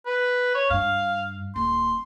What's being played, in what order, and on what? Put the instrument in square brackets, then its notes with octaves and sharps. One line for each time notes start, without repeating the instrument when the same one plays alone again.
[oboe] B4
C#5
[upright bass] G2 [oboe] F5
[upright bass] D#1 [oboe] C6